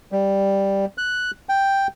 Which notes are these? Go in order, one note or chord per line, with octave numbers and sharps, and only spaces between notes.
G3
F#6
G5